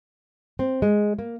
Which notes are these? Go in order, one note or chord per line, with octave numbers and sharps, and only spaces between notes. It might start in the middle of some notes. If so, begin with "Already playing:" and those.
C4
G#3
A#3